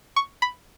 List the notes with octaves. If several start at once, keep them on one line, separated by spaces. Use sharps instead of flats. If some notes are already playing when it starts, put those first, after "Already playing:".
C#6
B5